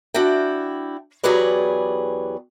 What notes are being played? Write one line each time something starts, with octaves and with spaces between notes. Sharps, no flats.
D4 E4 F#4 G5
E2 F#3 G4 G#4 B4 D5